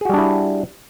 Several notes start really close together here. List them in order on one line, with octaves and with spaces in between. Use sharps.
G#4 F#4 G3 D4 E4